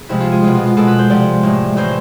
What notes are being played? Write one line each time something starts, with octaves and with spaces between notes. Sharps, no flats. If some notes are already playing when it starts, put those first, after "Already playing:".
Already playing: G#4
C3 F3 G#3 E4
F4
G#4
B2 G#3 F4
F4
F4
B2 G#3 A4
B4
C5
C3 F3 G#3 D5
A2 G#3
A2 E3 G#3 C5